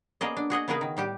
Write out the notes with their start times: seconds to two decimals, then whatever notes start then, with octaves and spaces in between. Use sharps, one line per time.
0.21 A#3 B3 C#4 G#4 D5 D#5
0.37 D4
0.50 F#4 G#4 D#5 F#5
0.68 C#3 B3 F#4 G#4 A#4 B4
0.81 D#3
0.97 A2 G3 G4